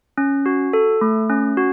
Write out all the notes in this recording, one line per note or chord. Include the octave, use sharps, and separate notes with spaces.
C#4
F#4
A4
A3
C#4
F#4